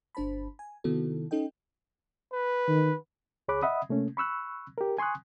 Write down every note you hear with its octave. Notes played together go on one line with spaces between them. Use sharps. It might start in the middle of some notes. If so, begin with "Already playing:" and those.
G1 D4 C5 A5 B5
G#5
C3 D#3 B3 E4 F#4 A4
C#4 D#4 A4 D#5 G5
B4
D#3
C#2 G#4 C#5 B5 D6 F#6
D#5 E5 F#5 B5 D#6
C3 A3 A#3 C#4
B5 C#6 E6 F#6
G4 A#4
G#5 C6 C#6 D#6 F#6